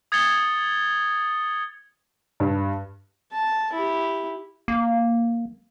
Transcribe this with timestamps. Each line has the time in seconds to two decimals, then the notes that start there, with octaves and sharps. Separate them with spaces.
0.12 D#6 G#6 A6 C#7 F7 G7
2.40 G2
3.32 A5
3.73 E4 G4
4.68 A#3